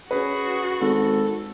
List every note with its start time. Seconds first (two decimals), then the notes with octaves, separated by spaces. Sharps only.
0.11 C#4 F#4 G#4 B4
0.81 G#1 A4